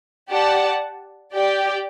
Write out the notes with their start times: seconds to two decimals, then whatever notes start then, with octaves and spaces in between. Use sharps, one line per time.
0.30 G4 D5 F#5 A5
1.34 G4 D5 G5